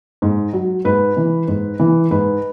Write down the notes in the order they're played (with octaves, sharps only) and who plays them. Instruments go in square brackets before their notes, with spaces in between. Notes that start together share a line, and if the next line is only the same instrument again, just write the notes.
[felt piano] G#2
F#3
G#2 B4
E3
G#2
E3
G#2 B4